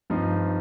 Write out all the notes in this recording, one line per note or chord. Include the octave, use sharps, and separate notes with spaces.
G2 F3 C4 D#4